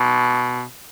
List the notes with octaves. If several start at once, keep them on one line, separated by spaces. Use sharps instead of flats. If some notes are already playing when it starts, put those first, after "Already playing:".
Already playing: B2